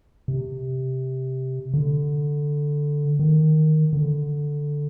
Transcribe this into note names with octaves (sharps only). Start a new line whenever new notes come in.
C3
D3
D#3
D3